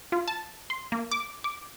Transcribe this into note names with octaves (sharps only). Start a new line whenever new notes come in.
F4
A5
C6
A#3
D6
D6